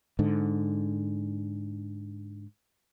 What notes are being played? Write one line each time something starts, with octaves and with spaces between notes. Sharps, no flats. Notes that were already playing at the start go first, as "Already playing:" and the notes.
G#2 D3